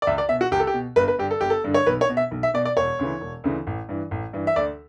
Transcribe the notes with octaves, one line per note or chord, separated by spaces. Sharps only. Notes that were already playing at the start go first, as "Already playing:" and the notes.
D5
C#2 E5
D5
B2 E5
F#4
C#2 G4
A4
G4
B2
G1 B4
B4
G2 D3 G4
A4
G1 G4
A4
G2 D3
C#5
B1 B4
C#5
B2
E5
B1
E5
B2 D5
D5
E1 C#5
D2 C#3 E3
E1
D2 C#3 E3
A1
G2 E3
A1
G2 E3
E5
D2 D5